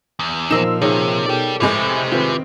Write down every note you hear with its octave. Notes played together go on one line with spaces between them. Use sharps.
E2
A#2 F3 D#4 A#4 C5 E6 E7
C3 D#3 G#4 A#4 C#5
B2 G4 A4 D5 G5
F1 A2 C3 G#3 G4 C5
D#3 C4 F4 B4